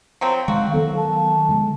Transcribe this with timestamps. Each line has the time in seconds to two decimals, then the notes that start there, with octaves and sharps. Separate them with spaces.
0.21 F3 F#3 C4
0.48 D#3 G#3 F#4 F5
0.73 D#3 F#3 B3 A4
0.97 A5
1.49 D3 F#3 G#3